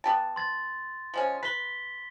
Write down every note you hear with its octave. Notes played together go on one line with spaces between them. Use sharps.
B3 G4 A5
C6 A6
F3 G#3 C#4
B4 B6 G7